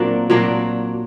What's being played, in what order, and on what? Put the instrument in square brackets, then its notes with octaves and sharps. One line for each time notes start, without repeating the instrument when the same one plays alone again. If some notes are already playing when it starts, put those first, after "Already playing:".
Already playing: [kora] A#2 F#3 A#3 C4 D4
A#2 F#3 A#3 D4